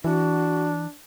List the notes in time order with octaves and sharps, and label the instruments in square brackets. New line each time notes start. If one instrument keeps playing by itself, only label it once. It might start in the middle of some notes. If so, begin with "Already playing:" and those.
[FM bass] E3 [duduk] D4 [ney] F#4